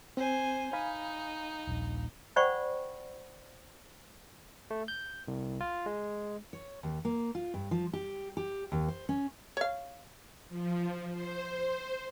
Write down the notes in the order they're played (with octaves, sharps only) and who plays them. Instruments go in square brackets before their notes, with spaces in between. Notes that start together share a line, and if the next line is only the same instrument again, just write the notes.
[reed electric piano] C4 [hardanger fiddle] C5 G#5
[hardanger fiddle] D#4 [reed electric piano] F5 G#5 B5
[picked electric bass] D#1 A#1
[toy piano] C5 D5 F#5 G5 B5 C#6
[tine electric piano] A3
G6
C2
F4
G#3
[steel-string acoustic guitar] C#5
D#2
A#3
F4
G2
F3
G4
G4
D#2
C5
C#4
[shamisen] C#5 F5
[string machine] F3
C5